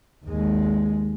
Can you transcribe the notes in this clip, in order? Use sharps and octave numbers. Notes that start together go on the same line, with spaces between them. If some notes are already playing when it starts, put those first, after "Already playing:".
D#2 G#3